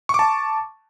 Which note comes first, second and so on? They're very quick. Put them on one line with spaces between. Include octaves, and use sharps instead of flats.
C#6 D6 A5